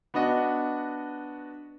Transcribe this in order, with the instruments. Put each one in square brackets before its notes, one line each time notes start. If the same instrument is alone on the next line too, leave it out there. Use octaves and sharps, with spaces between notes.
[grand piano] B3 D4 F#4 D#5 F#5